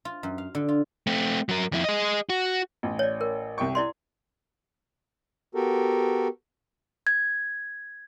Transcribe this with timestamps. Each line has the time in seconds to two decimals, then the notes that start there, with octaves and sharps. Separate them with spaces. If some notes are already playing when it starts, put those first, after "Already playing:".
0.05 F4
0.23 F#2
0.38 F5
0.55 D3
0.69 F4
1.07 A3 C4
1.49 F#3 A#4
1.72 F2 E4
1.84 G#4 D#5
2.30 F#4
2.83 A1
2.99 C#5 D5
3.21 A#4
3.58 C2 G5 C#6
3.75 E4 D5 C6
5.55 B3 F#4 G4 A4 A#4
7.07 G#6